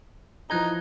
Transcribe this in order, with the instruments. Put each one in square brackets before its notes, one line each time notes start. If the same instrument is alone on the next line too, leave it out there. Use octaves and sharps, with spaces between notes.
[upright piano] E3 F3 A#5 [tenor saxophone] D#4 [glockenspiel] F#6 G#6 G7